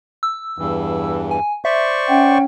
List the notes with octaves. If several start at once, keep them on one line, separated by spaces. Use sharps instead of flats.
E6
E2 G2 E3
G#5
C5 D5 E5 C#6
C#4 F#5 G5